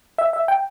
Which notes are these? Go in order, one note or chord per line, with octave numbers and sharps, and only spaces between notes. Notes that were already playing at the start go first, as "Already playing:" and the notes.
E5
E5
G5